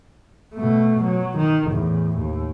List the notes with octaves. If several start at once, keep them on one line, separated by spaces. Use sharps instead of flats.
B2 A3
F#3
D#3
E2 A2
D#2